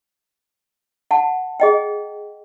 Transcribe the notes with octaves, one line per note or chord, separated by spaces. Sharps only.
F#5 A5
G#4 D#5 G5